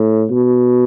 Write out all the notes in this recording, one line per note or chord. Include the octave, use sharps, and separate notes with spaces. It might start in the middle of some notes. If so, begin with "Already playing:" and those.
Already playing: A2
B2